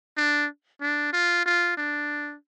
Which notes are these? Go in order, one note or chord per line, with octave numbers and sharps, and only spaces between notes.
D4
D4
F4
F4
D4